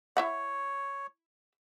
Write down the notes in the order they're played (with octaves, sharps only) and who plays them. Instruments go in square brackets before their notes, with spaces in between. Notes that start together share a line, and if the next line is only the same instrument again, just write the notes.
[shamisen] E4 E5 F#5 [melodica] C#5